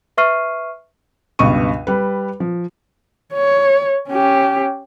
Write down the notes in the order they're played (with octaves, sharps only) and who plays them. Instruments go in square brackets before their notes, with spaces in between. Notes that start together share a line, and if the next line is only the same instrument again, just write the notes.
[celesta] B4 E5 C#6 F6 C7 D#7
[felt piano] C#2 G2 B2 C#6 D#7
G3 B4
F3
[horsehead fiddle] C#5
C#4 G4